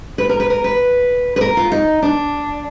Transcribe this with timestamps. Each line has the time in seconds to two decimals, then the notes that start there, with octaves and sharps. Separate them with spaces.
0.18 B4
0.29 A#4
0.40 B4
0.50 A#4
0.64 B4
1.36 B4
1.41 A#4
1.57 F4
1.72 D#4
2.02 D4